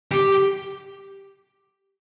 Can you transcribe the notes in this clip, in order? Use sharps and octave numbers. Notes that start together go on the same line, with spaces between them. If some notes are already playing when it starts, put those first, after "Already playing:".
G4